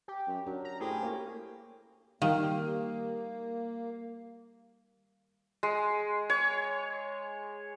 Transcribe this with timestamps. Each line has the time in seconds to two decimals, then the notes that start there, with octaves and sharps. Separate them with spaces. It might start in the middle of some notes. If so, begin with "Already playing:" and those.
0.08 G4
0.27 F#2
0.47 F#3 C#4 D4 A#4
0.65 A#5
0.80 A2 G4 G#4 A#4 C5
1.03 A#3 C#5
2.22 D#3 G3 A#3 G4 F5
5.63 G#3
6.30 C#5